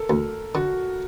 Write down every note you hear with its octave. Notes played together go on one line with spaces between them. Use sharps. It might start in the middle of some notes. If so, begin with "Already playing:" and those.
Already playing: A4 A#4
D2
D3 F#4